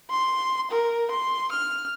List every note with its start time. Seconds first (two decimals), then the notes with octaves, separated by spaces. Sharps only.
0.10 C6
0.71 A#4
1.11 C6
1.52 F6